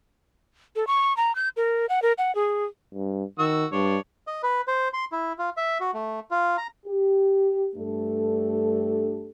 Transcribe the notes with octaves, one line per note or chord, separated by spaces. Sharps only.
A4
C#6
A#5
G6
A#4
F#5
A#4
F#5
G#4
G2
D#3 F#4 E6
G2 D4 C#5
D#5
B4
C5
C6
E4
F4
E5
F#4
A3
F4
A#5
G4
G2 A3 D4 G4 A4